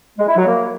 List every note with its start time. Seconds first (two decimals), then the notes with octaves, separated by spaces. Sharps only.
0.18 G#3
0.28 E4
0.37 F#3
0.46 A#3